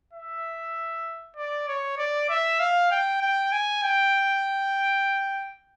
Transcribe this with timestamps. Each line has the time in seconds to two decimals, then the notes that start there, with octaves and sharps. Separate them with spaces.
0.13 E5
1.37 D5
1.68 C#5
1.98 D5
2.29 E5
2.60 F5
2.91 G5
3.21 G5
3.52 G#5
3.84 G5